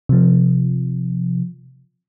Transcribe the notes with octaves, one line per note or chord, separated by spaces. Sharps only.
C3 F3